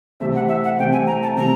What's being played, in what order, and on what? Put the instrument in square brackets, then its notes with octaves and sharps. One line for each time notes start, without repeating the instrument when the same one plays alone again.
[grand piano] C3 E3 A3 C4 [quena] E5
[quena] F#5
E5
F#5
[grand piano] C3 E3 A3 C4 [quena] G5
[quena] G#5
A#5
A5
[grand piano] C3 E3 A3 C4 [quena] A#5